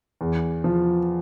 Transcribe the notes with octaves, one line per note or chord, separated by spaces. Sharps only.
E2
F3